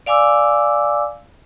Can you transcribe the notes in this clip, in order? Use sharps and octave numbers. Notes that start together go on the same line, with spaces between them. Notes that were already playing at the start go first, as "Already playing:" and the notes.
D5 F5 G#5 D6 E6